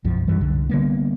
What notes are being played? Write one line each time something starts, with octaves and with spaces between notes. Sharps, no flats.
B1 F#2 F3
F#2 E3 G3
C2 D3
D3 G3 A#3 B3